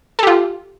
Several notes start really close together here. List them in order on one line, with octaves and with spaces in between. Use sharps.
A4 G4 F4